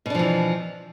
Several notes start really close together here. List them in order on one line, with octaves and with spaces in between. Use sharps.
B2 D4 F3 E3